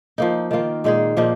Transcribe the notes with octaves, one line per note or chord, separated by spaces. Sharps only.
F3 A#3 D#4
D#3 A#3 F4
A#2 G#3 D#4 G#4
A#2 F3 A#3 D#4